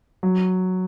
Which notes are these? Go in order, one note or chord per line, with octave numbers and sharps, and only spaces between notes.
F#3